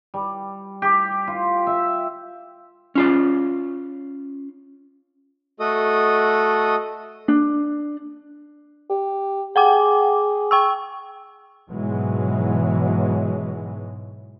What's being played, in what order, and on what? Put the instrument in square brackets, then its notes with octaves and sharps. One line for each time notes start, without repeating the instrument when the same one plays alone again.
[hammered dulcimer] G3
G4
F4
E5
[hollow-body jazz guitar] C#4 F4 D5
[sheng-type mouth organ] A3 F#4 A4 D#5 D#6
[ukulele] D4
[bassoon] G4
[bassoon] G#4 [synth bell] F#5 G5 D6
[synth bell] G5 C#6 E6
[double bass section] G#2 B2 E3 F#3 G#3